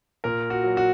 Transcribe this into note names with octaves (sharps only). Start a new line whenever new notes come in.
A#2 A#4
F#4
F#3
F#4